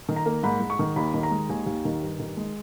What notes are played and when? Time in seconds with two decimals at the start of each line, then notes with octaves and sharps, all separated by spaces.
0.09 D#3
0.16 A#5
0.26 A#3
0.43 G#2 B5
0.60 G#2
0.70 C#6
0.79 D#3
0.96 D#2 B5
1.14 D#3
1.23 A#5
1.31 G#3
1.49 D#2 G#5
1.66 D#2
1.85 D#3
2.03 G2
2.19 D#3
2.37 G#3